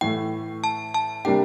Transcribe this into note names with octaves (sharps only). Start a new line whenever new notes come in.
A2 E3 A3 G5
A5
A5
C3 G3 A#3 D4 G4 G5